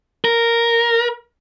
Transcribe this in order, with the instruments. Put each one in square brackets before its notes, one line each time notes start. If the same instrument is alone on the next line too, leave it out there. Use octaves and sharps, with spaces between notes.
[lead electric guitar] A#4